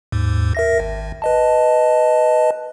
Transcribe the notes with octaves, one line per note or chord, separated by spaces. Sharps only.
D#2 G#2
A#4 E5 A#6
G#1
B4 D#5 A5